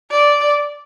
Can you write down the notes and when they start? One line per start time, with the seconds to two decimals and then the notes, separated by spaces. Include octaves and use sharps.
0.11 D5